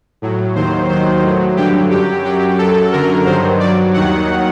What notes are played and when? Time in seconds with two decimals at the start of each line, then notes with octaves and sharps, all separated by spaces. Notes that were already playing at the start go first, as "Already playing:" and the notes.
0.22 A2 F#3
0.55 D#2 D#3 F#3 C5
0.89 D#2 D#3 F#3 C5
1.23 A2 F#3
1.57 G2 D3 F#3 G4
1.91 F#2 F#3 G4
2.25 F#2 F#3 G4
2.59 F#2 F#3 A4
2.92 F#2 D3 F#3 A#4
3.26 G2 D#3 F#3 C5
3.60 G2 F#3 D5
3.94 D#2 D#3 F#3 F#5